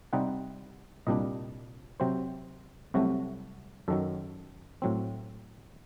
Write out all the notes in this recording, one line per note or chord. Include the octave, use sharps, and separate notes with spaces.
C3 G3 C4 D#4 F#5
C2 A#2 G3 D4 D#5
C3 F#3 C4 C5
C2 C3 F#3 A3 F#4
F#2 D#3 F#3 A4
A2 F#3 C4